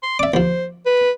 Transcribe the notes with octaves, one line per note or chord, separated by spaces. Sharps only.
C6
D5 E5 D6
D#2 F3 C5
B4